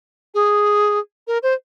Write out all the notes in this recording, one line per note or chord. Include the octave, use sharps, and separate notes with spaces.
G#4
A#4
C5